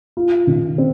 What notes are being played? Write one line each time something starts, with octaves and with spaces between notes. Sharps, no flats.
F4
D#3
C4